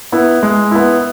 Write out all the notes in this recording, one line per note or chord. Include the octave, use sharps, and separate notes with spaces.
B3 E4
G#3
B3 E4